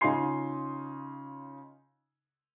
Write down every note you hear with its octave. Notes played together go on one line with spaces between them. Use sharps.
C#3 D#4 F4 G#5 C6 C7